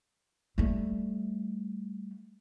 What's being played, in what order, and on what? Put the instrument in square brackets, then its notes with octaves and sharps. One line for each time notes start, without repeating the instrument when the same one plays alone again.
[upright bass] G3 A3